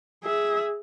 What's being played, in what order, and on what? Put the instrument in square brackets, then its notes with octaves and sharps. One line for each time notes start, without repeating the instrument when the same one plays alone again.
[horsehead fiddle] G#4 E5